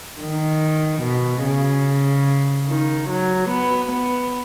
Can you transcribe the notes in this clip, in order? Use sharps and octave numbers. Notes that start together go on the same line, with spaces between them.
D#3
B2
C#3
D#3
F#3
B3
B3